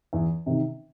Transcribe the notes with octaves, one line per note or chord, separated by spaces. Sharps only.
E2
C3 D#3